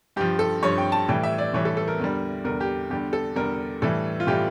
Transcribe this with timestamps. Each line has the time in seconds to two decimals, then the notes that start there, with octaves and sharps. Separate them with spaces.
0.16 G2 F3 G4
0.39 A4
0.63 G2 F3 C#5
0.78 G5
0.92 A5
1.08 A2 E3 G3 G5
1.23 E5
1.38 D5
1.53 A2 E3 G3 C#5
1.65 A4
1.77 A4
1.88 A#4
1.99 E2 D3 G3
2.44 E2 D3 G3 A#4
2.61 G4
2.90 E2 D3 G3 G4
3.13 A4
3.36 E2 D3 G3 A#4
3.82 A2 E3 G3 A4
4.20 F4
4.27 A2 E3 G3 G4